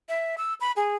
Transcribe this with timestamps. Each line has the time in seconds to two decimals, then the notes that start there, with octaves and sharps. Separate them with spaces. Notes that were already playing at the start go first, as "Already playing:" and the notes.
0.09 E5
0.38 E6
0.61 B5
0.76 G#4